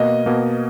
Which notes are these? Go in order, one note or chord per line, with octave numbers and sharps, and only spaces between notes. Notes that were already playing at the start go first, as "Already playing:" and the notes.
Already playing: B2 A#3 D#5
B2 A#3